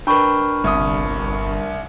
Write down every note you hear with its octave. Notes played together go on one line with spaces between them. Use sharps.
D4 A#4 B4 G5 B5 C#6
G1 C2 D#6